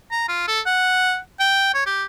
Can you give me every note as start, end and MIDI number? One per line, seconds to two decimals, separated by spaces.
0.11 0.24 82
0.28 0.47 65
0.48 0.60 69
0.66 1.17 78
1.40 1.72 79
1.74 1.83 73
1.86 2.04 67